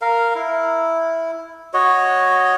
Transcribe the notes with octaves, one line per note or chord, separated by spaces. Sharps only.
A#4 F5
E4
F#4 C#5 D#5